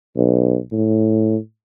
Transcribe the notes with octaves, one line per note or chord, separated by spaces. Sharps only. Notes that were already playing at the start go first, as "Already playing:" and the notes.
B1
A2